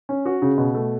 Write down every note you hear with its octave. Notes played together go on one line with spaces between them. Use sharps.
C#4
F#4
C#3
B2
A3